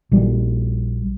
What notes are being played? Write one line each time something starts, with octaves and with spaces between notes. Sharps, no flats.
A#1 G3